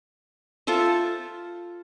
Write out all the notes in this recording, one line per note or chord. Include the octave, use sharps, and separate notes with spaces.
F4 A4 C5 E5